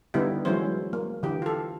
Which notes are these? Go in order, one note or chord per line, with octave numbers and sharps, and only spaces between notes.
D3 G3 B3 D#4 E4 G4
E3 F#3 G#3 C#4 E4 C5
A#3
D3 E3 G4
F4 A4